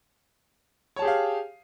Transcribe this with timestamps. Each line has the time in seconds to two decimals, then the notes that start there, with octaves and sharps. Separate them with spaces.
0.96 C#5
0.99 A5
1.02 G#4
1.05 G4
1.07 F5